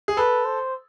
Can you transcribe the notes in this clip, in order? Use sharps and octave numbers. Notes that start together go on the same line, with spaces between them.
G#4
A4 B4
C5